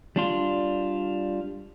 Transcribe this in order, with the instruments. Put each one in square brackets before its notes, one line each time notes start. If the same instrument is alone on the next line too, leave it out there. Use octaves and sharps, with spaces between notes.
[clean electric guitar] G3 D4 F4